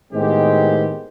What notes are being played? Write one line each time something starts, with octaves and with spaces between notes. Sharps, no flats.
A2 D#3 G#3 B3 C4 G4